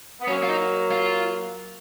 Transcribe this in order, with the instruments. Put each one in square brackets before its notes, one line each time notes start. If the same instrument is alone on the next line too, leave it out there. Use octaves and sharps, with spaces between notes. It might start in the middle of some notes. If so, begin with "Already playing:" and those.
[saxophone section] B3
[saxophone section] F#3 A#3 [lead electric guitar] C#4
[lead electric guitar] F4
D#4
F4